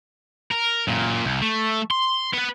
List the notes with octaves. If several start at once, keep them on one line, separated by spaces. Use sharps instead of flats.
A#4
F#2 A#2
C2
A3
C6
B3 B4